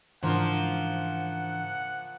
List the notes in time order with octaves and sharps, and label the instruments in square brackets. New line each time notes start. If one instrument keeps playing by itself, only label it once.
[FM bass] G#2 [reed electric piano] C#3 E3 D4 [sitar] F3 A#3 F4 [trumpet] F#5